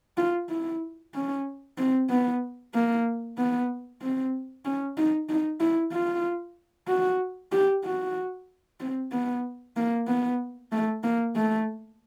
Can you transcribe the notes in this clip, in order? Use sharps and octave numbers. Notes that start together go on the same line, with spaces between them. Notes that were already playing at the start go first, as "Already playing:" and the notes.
F4
E4
C#4
C4
B3
A#3
B3
C4
C#4
D#4
D#4
E4
F4
F#4
G4
F#4
C4
B3
A#3
B3
A3
A#3
A3